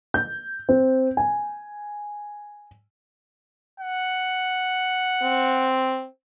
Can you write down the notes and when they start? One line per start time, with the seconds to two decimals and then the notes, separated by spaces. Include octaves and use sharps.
0.14 G6
0.69 C4
1.17 G#5
3.80 F#5
5.23 C4